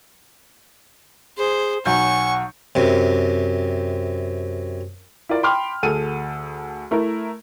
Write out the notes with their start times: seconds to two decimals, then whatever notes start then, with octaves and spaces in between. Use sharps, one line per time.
1.38 G#4 C5
1.86 B1 F#3 F#5 G#5 C#6 G6
2.75 F#2 C3
5.29 E4 F4 A#4 D5
5.43 G5 B5 C6 D6 F6
5.83 D2 G#4 A4 D#7
6.91 A3 E4 A#4